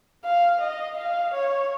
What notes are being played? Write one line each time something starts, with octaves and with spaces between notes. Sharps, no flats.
F5
D#5
F5
C#5